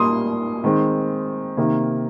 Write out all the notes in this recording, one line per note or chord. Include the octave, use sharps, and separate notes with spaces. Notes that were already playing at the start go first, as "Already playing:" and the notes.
Already playing: A#2 G3 A#3 C6 D#6
D#3 G#3 C4
C3 D#3 A#3